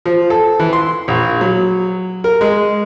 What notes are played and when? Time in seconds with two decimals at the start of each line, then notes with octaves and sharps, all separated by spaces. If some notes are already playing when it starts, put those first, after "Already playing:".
0.06 F3
0.30 A4
0.60 E3
0.73 C6
1.08 A#1
1.41 F#3
2.24 A#4
2.41 G#3